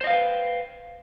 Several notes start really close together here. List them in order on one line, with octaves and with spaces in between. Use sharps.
C5 D#5 F5 B4 G5